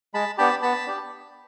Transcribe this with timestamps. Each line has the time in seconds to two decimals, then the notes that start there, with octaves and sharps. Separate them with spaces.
0.14 G#3 A5 B5
0.38 B3 D4 G4 A5 B5
0.62 B3 A5 B5
0.87 D4 G4